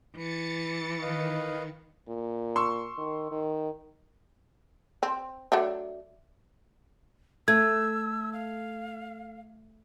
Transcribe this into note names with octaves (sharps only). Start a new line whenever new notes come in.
E3 A6 C#7
D#3 B4 D#5 F5
A#2
C6 C#6 E6
D#3
D#3
C4
F#3 A3 D4
A3 E6 G#6
F5